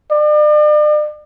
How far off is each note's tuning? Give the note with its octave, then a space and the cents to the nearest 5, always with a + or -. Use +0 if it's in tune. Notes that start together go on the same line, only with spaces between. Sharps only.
D5 +40